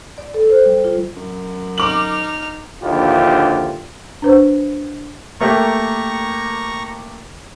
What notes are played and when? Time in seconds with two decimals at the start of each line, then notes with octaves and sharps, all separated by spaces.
0.18 D5
0.34 A4
0.49 C5
0.66 G3
0.84 F4
1.16 F#2
1.78 D#4 D6 F6 F#7
2.82 A#1 D#2 D3 E4 F4 G4
4.22 D4 B4 C5
5.40 A3 A#3 G4 A#5 C#6